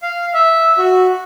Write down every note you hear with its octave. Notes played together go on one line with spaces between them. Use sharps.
F5
E5
F#4